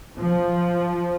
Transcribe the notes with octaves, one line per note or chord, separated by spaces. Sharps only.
F3